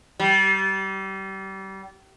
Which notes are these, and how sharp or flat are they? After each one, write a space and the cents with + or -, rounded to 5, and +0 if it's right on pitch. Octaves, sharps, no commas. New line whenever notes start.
G3 -30